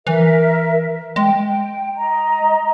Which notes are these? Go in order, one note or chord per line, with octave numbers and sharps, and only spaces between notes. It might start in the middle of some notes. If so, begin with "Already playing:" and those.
E3 A#4 E5
G#3 G5
D#5 A#5